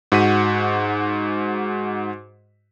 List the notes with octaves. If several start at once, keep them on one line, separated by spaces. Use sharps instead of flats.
G#2 F#4 F#5 B6 D#7